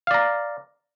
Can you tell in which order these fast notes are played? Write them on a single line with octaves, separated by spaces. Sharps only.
F5 D5 A#5